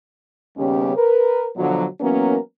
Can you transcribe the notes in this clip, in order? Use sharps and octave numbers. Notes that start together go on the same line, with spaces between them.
D#2 C#3 G3 B3 C#4 G4
A#4 B4
B2 D3 F3 F#3
E3 F#3 A#3 B3 C#4 A#4